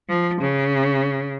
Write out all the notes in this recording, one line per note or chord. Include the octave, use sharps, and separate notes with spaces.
F3
C#3